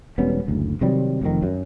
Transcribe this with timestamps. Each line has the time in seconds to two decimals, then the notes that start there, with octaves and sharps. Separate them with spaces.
0.18 E1 G3 B3 C#4
0.48 F#1 D2
0.81 C3 D#3 F#3 G3
1.21 F1 F2 D#3
1.43 F#2